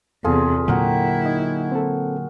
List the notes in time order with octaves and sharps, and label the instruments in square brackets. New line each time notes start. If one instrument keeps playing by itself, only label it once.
[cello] E2 C3 [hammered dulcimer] F4 G#4 [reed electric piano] A4
[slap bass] A#2 D3 F#3 [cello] E4 [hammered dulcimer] F#4 A#4 G5
[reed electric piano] D#4 D#5
C4 A4